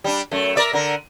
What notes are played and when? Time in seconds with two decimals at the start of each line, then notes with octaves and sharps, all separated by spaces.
0.04 G3 D4
0.31 F#2 A3
0.55 A#4 D5 E5
0.73 D3 A#4